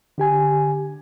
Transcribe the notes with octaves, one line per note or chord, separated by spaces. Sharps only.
D3 G4 G#5